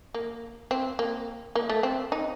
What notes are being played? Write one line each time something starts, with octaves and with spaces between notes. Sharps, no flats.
A#3
C4
A#3
A#3
A3
C4
D#4